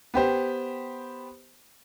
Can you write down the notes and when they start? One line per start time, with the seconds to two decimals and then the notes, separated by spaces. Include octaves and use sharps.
0.14 B3 G4 C5